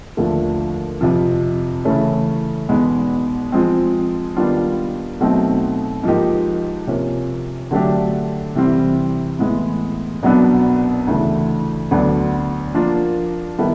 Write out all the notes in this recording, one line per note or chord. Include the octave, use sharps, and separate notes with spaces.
D#2 D3 F3 A3
F2 C3 F3
C#3 E3 A3 C#4
E2 B2 G#3 B3 D#4
F3 G#3 C4
D#3 G3 B3 D4 F4
B2 F#3 A3 C4 D#4
G#2 F3 A#3 D#4 G4
C3 F3 A#3 C#4
D3 F#3 A3 D4 G4
C3 E3 G3 C4
A2 E3 G#3 B3
C2 B2 F#3 B3 D4
D2 C#3 E3 A3
D2 D3 F#3 B3 D4
F3 A#3 D4 F4 A#4
D#3 G3 B3 E4 A4